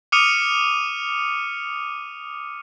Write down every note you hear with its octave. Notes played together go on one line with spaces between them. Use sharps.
D6 D#6 F6 C#7 D#7 F7